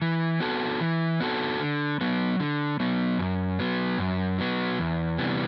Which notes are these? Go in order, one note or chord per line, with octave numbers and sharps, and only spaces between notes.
E3
B3 F#4 A4
E3
B3 F#4 A4
D3
F#3 B3
D3
F#3 B3
F#2
F#3 B3
F#2
F#3 B3
E2
C3 E3 G3 B3